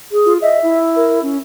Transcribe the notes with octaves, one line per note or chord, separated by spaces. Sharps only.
G#4
F4
D#5 E5
E4
A#4
C#4